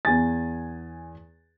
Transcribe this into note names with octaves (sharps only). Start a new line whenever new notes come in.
E2 G#5 A6